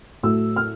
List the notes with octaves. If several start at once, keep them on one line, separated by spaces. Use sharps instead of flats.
A2 F#3 A3 E6
F6